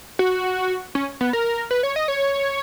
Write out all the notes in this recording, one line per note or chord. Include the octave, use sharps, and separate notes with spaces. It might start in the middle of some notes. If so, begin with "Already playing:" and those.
F#4
C#4
B3
A#4
B4
C#5
D#5
C#5